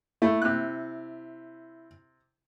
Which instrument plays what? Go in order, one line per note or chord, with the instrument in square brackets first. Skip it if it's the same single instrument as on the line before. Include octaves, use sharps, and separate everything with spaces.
[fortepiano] A3 [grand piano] E4
[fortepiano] C3 F#6